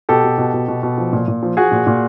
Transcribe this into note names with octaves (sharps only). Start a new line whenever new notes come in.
B2 G4 A4
B2
B2
B2
B2
B2
F3
A#2
A#2
F3
F3 F#4 G#4
A#2
A#2